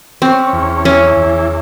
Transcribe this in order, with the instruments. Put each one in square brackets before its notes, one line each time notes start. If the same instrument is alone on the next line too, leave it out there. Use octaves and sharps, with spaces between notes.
[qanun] C4 [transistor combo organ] C#4
[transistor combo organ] E2
[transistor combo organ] E3 [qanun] C#4
[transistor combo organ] E2